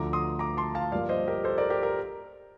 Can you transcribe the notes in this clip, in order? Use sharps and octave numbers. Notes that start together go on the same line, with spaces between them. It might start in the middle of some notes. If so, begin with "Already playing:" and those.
Already playing: D2 D3 F3 A3 A#5 D6
C6 D#6
A#5 D6
A5 C6
F5 A5
G2 F3 A#3 D5 F5
C5 D#5
G4 A#4
A4 C5
A#4 D5
G4 A#4
A#4